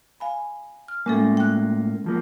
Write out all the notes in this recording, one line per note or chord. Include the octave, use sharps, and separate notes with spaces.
F5 G#5 B5
F6
A2 G#3 A#3 C#4 A4
G5 F#6
C#2 F3 A#3